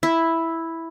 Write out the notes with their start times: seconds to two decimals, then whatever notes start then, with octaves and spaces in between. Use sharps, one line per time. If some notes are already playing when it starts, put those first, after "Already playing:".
0.03 E4